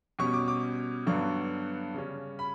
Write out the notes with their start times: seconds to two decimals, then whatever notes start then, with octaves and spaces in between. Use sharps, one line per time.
0.19 B2 G3 C#4 C#6
0.34 D6
0.48 D6
1.06 G2 D3 F#3 B3 D4 C#6
1.94 C#3 G3 C#4
2.39 B5